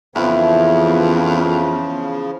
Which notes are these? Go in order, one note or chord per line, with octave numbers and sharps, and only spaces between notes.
F2 C#3 E3 F3 B3 E4